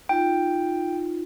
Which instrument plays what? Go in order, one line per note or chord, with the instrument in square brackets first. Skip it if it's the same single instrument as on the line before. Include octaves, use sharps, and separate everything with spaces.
[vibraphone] D#4 F4 [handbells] G5